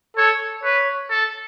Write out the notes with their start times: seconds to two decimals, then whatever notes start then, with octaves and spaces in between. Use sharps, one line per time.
0.17 A4 C#5
0.63 B4 C#5
1.10 A4